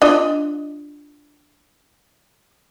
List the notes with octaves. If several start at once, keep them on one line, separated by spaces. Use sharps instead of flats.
D4 F4 D#5